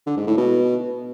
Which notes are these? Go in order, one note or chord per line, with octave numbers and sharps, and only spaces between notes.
D3
G#2
A2
B2